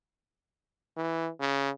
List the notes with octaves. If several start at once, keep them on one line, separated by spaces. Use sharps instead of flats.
E3
C#3